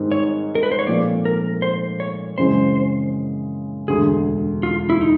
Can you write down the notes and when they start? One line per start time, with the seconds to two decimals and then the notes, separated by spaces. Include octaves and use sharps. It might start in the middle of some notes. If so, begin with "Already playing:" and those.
Already playing: G#2 D#3 G3 C4 D#4
0.12 C#5
0.55 A#4
0.63 B4
0.71 C5
0.79 C#5
0.87 A#2 F3 A3 C4 F4 D5
1.25 A#4
1.62 C5
2.00 C#5
2.38 F#2 C#3 E3 G#3 C4 C5
3.88 E1 D2 D3 G#4
4.63 F4
4.90 E4
5.01 D#4